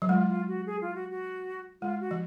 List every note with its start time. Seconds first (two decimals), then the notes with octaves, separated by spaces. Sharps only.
0.02 F#3
0.09 G#3 F4
0.28 F4
0.48 F#4
0.66 G#4
0.81 F4
0.95 F#4
1.10 F#4
1.82 G#3 F4
2.01 F#4
2.11 F3